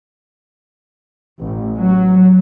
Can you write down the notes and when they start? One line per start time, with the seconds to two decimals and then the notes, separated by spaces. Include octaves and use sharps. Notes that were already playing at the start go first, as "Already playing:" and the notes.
1.40 A1
1.77 F#3